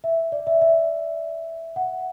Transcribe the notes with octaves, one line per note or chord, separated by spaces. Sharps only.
E5
D5
E5
E5
F#5